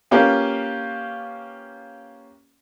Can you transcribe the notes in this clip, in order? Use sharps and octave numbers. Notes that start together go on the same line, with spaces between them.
A#3 C#4 F4 G4 B4